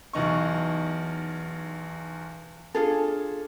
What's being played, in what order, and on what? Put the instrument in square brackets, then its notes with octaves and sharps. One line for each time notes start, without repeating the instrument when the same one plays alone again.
[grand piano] B1 E2 D#4 C#6
[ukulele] D4 F4 G#4 A4